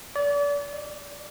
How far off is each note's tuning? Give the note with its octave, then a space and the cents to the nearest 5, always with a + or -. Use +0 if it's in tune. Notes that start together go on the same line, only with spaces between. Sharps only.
D5 -35
D5 +30